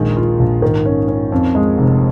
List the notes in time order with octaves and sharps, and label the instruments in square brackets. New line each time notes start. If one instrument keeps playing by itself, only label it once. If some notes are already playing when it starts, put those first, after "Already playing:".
Already playing: [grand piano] A#1 D#2 [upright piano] D#3 G#3
[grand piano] F4
A#1
[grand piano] G#2 [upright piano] D#3
[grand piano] C#4
C#4
F2
G#3
F1